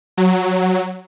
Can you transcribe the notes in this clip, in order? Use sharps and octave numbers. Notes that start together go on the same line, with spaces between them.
F#3